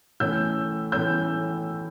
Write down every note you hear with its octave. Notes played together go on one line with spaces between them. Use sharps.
A2 E3 A3 C#4 E6 G6
A2 E3 A3 C#4 E6 G6